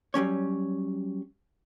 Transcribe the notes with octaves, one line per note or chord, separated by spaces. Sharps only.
F#3 G3 C#4 C#5